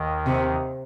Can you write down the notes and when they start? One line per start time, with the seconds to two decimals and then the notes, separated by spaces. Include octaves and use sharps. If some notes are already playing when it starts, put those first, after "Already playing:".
Already playing: D#2 D#3
0.26 C3